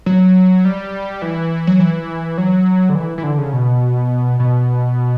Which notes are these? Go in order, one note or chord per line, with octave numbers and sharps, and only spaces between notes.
F#3
G3
E3
F#3
E3
F#3
D3
E3
E3
D3
C#3
B2
B2